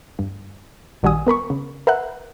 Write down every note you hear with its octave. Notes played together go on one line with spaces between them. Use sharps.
G2
A#1 D#3 G3 F#4 G#5 D#6
B3 A#4 B5 C#6
C#3
A#4 B4 E5 F#5 F#6